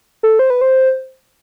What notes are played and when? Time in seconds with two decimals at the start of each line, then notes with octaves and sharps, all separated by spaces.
0.23 A4
0.39 C5
0.50 B4
0.61 C5